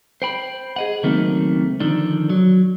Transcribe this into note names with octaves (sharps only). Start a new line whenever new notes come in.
C5 G5 B5
G#4 D#5 F#5
C#2 D#3 F#3 A3 A#3 C4
D3 D#3 F3 D4
F#3